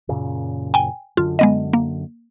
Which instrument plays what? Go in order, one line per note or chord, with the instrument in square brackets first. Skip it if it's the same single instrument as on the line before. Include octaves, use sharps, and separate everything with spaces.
[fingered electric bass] F#2 A#2 C#3
[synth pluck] G5 G#5
[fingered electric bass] F#2 D3 [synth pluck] F4
[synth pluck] G#3 B3 D#5
A#3